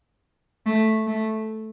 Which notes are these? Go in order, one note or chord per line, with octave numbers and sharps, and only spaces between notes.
A3
A3